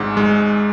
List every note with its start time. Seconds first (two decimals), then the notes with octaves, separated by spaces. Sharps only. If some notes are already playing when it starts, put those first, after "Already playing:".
Already playing: G#1 G#2
0.17 G#3